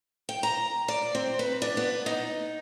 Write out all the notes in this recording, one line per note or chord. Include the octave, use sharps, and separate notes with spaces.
G5
A#5
D5
C4
B4
D4
B3
D#4